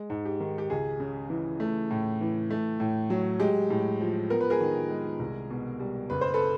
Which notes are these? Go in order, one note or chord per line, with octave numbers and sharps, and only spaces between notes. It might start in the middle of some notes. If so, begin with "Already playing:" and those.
Already playing: G#3
G#2
G4
D#3
G4
C#2 G#4
C#3
E3
A3
A2
E3
A3
A2
F#3
G#3 G4
A2
F3
B3 A#4
B4
G#4 A#4
D#3
G#3
C2
B2
G3
F#1 B4
C5
A4 B4